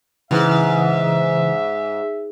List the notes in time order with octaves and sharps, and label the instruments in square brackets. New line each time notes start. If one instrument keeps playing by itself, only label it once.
[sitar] G#2 [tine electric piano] C#3 E3 [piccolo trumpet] E5